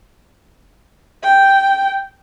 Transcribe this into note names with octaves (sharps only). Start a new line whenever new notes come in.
G5